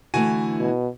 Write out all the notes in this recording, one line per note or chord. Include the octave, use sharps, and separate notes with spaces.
D3 E3 A3 F#4 G#5 D#7
B2